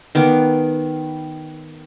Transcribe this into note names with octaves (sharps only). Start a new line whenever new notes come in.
D#3 B3 D6